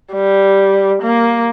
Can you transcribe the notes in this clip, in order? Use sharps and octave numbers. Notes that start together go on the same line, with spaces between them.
G3
A#3